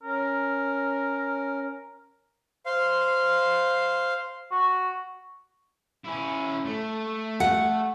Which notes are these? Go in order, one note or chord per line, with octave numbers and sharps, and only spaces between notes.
C#4 A#4
C5 F5
F#4
C#4 E4
A3
F#5